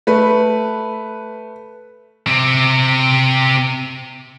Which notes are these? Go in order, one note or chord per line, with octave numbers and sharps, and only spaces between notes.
A3 B4
C3 C4